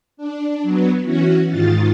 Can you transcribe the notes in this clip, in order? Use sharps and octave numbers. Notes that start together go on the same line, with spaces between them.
D4
F#3 B3
E3 C#4 F#4
G#2 D#3 F4 A6